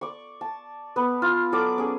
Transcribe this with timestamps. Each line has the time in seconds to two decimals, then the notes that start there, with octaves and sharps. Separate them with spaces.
0.01 D5 C#6
0.41 A5
0.96 B3 B4
1.22 F4
1.52 F#3 A4 D5 D6
1.78 C#4 G#4